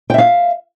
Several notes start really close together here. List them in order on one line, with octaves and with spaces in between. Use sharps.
G5 E5 F5